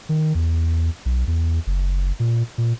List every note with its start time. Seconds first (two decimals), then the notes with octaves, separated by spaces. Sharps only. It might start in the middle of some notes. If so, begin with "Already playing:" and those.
0.09 D#3
0.35 E2
1.06 B1
1.27 E2
1.67 F#1
2.20 A#2
2.58 A#2